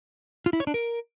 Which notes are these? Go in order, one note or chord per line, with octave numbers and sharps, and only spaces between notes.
F4
E4
C#5
D4
A#4